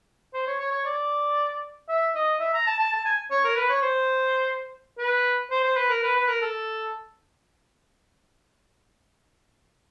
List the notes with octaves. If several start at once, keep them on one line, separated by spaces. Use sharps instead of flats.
C5
C#5
C#5
C#5
D5
E5
D#5
E5
A#5
A5
A5
A5
G#5
C#5
A#4
B4
C#5
C5
B4
C5
C5
B4
A#4
B4
B4
A#4
A4